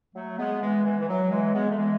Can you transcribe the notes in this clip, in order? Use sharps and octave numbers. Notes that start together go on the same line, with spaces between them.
F#3 A3
G#3 B3
E3 G#3
E3
E3
F#3
E3 G#3
G#3 B3
A3
E3 G#3